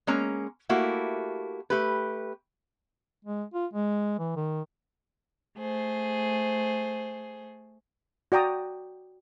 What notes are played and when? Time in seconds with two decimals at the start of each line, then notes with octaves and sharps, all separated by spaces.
0.07 G#3 A#3 C#4 A#5
0.69 A3 A#3 E4 F#4 G4
1.70 A3 G4 B4
3.25 G#3
3.54 F4
3.73 G#3
4.19 E3
4.36 D#3
5.58 A3 G#4 C5
8.32 F#4 D5 G5 A#5 D#6